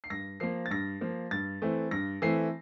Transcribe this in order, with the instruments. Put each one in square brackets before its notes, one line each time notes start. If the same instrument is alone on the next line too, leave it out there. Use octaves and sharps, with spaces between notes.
[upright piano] C7
G2 A#6
F3 A#3 C7
A6
G2 A#6
F3 A#3
G2 A6
E3 A3 C4
G2 A#6
E3 A3 C4 C7